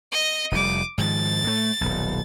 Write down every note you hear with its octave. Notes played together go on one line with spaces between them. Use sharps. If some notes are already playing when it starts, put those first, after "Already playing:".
D#5 A#6
F1 A2 G3 D6 D#7
G#2 D#3 F3 A6
A2 A3
D#1 B1